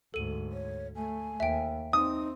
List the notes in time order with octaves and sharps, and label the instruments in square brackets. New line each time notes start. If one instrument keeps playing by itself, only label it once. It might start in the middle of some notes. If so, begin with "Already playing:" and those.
[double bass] D2 G#2 [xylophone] A4 D#7
[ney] C#5
[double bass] A3 [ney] G#5
[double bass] D#2 [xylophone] E5 G5
[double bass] C4 [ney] D#4 [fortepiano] D#6